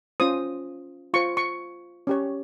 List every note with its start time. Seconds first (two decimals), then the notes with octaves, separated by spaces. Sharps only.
0.20 C#4 F4 C5 D#6
1.14 F4 C5 C#6
1.37 C#6
2.07 C#4 G4 C#5